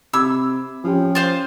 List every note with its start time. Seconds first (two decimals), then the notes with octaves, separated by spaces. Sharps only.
0.13 C3 B5 D6 E6 G#6
0.84 F3 C#4 G4 G5
1.15 F4 C5 F5